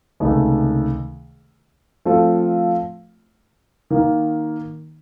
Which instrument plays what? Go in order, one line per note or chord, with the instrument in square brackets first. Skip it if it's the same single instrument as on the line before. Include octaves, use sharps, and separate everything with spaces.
[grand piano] C#2 C3 D#3 A3
F3 A3 C4 F4 A4
D#3 A#3 D#4